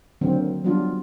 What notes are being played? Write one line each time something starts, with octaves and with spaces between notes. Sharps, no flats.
D3 D#3 F#3 A#3 C4
F#3 G3 B3 D4 F4